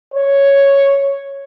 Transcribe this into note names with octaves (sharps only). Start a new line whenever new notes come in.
C#5